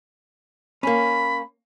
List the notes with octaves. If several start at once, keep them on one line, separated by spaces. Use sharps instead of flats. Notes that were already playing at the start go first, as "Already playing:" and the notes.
A#3 C#4 B5